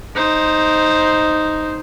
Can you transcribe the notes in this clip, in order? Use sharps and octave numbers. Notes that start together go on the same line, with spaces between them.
D#4 C5